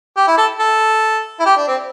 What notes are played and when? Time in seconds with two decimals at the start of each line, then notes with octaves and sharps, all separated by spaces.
0.17 G4
0.27 E4
0.38 A4
0.59 A4
1.39 E4
1.46 G4
1.57 D4
1.68 C4